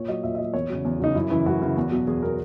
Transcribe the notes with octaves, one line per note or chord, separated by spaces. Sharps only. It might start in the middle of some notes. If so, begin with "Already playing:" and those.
Already playing: A#2 C#5
F#3 D#5
A#2 E5
E5
F#3 D#5
E2 C#5
C#3 F#3
E2
C#3 F#3 D#4
F#2 E4
C#3 E3 E4
F#2 F#4
C#3 E3
E2
B2 F#3
E2 G#4
B2 F#3 A#4